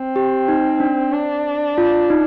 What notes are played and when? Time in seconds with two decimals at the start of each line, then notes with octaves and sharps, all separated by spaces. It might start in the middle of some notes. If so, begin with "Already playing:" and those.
Already playing: C4
0.16 G4
0.48 D#4
0.80 D4
1.13 D4
1.78 F4
2.10 D#4